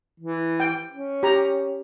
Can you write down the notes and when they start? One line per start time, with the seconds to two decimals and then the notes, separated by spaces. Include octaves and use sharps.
0.20 E3
0.60 G5
0.92 C#4
1.23 G4 A#5